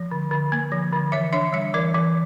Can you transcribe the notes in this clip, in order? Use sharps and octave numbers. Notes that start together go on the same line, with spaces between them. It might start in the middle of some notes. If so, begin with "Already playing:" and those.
Already playing: F3
D3
D3
A#3
F3
D3
E3 C#5 E5
D4 C#5 E5
G3 C#5 E5
E3 A#4 D5
E3